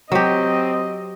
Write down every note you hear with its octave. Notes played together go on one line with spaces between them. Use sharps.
F#3 C4 G4 D#5